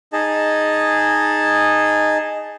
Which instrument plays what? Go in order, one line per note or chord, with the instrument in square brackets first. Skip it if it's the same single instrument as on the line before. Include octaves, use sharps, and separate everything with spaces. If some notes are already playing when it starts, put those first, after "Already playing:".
[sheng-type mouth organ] D#4 G#4 D#5 A5